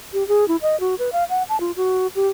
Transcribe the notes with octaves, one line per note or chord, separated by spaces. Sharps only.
G4
G#4
E4
D#5
F#4
B4
F5
F#5
A5
F4
F#4
G4